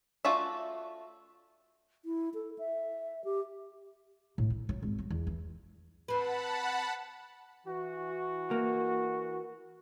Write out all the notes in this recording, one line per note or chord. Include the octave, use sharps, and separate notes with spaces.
A3 F4 F#4 D5 E5
E4
A4
E5
G4
A2
E4
F#3
G#1
F#3
E2
E3
C4 B4 F#5 A5 B5
E3 F#4
A#3